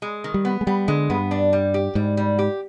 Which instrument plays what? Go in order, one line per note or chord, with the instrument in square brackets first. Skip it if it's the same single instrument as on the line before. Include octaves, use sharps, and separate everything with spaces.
[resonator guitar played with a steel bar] G#3
D#3
[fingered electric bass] G3
[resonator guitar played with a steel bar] B3
[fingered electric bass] G#3
[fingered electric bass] G3 [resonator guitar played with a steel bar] B3
[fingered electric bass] D3 [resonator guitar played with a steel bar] G#3
[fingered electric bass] G2 [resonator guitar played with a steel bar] B3
[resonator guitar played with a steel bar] D4
G3
G4
[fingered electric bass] G#2 [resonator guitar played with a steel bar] G3
[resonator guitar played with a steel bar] G3
G4